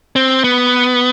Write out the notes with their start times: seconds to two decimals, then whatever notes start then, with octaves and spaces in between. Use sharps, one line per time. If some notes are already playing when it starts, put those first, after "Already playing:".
0.16 C4
0.44 B3